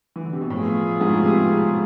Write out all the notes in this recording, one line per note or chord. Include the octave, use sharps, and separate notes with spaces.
E3
D3
C3
B2
A2 F3 B3 F4 G#4
G#2
A2
B2
C3